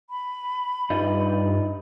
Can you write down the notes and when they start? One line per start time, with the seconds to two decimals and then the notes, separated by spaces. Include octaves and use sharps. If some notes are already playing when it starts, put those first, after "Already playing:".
0.10 B5
0.90 G2 D#4 F4 B4